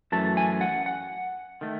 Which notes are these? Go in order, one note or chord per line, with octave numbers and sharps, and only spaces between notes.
F#2 E3 A3 A5
G#5
F#5
F#5
D#3 A3